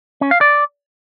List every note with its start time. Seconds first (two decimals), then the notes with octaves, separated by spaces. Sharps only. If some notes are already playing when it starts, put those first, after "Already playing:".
0.21 C#4
0.31 F5
0.41 D5